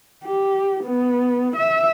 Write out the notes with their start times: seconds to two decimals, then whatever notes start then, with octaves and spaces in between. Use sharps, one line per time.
0.24 G4
0.84 B3
1.56 E5